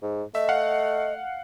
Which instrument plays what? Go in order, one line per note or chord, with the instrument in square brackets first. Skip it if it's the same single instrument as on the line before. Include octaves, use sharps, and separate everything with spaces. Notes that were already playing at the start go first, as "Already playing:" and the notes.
[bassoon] G#2
[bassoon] A3 [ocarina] D#5 [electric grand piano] E5
[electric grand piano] F5 F#5